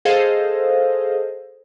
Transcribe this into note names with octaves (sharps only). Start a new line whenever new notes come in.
G#4 A4 C5 D#5 F5